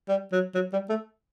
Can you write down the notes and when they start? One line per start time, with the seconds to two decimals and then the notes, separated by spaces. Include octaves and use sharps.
0.08 G3
0.32 F#3
0.55 F#3
0.73 G3
0.89 A3